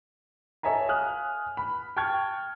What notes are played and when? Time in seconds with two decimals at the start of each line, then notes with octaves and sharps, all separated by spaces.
0.63 A4 C#5 D#5 E5 G#5 A#5
0.88 F5 G#5 D#6 F6 F#6
1.57 B5
1.97 G5 A5 C#6 F6 F#6 G#6